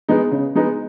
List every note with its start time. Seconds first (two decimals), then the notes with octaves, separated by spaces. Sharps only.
0.08 G#3 B3 D#4
0.31 C#3
0.55 G#3 B3 D#4